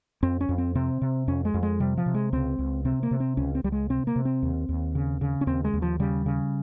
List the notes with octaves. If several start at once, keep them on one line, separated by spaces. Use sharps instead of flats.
F2 C4
C#4
F2
C4
C3 C4
C3
F2 C#4
G#3
F2
G#3
C3 G3
F3
C3
G#3
C#2 C4
C#2
C3 C4
A#3
C3
C4
C#2 C#4
C4
C#2 G3
G#3
C3 C4
A#3
C3
C4
D#2
D#2
C#3
C#3
C#4
D#2 C4
G#3
D#2
F3
C#3 G3
C#3